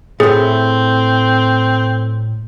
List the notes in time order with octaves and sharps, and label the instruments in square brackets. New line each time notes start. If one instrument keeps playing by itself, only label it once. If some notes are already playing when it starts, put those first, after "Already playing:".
[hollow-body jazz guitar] A2 A3 [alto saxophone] C4 [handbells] G#4